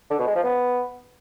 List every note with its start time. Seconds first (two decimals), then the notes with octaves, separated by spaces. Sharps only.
0.11 D3
0.19 B2
0.27 G#3
0.36 F3
0.44 B3